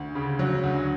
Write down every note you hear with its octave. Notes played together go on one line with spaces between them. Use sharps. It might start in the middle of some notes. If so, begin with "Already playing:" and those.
Already playing: D2
C#3
F#3
D2